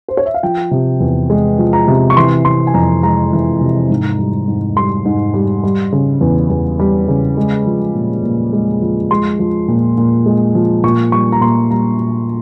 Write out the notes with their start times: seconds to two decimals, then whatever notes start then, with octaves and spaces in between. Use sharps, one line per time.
0.08 C5
0.17 C#5
0.26 E5
0.34 F5
0.43 F3 G5
0.71 C3
1.00 E2
1.30 G#3
1.59 F3
1.73 A#5
1.88 C3
2.10 C#6
2.17 E3 C6
2.45 C3 C6
2.67 G#5
2.74 F2 A#5
3.03 G#3 A#5
3.32 E3
3.61 C3
3.90 G#2
4.19 G3
4.48 G#2
4.76 G3 C6
5.05 G#2
5.34 G3
5.63 G3
5.92 C#3
6.21 E2
6.50 E2
6.80 G3
7.08 C#3
7.37 G#3
7.66 F3
7.94 A#2
8.23 A#2
8.52 G#3
8.82 F3
9.11 G#3 C6
9.39 F3
9.68 A#2
9.98 A#2
10.26 G#3
10.55 F3
10.83 A#2 C#6
11.12 G3 C#6
11.32 A#5
11.41 A#2 C6
11.71 G3 A#5
11.99 A#2